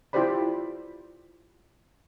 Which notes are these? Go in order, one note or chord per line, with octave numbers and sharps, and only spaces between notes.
E4 F4 G4 C5 D5 B5